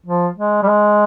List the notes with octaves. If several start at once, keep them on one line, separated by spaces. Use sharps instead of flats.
F3
G#3
G3
G#3